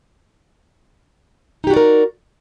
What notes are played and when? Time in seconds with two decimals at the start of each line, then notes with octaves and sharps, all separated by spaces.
1.64 D#4
1.67 G4
1.70 F#4
1.73 D5
1.77 A#4